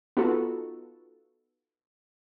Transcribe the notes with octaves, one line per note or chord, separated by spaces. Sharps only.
B3 D#4 F4 F#4 A4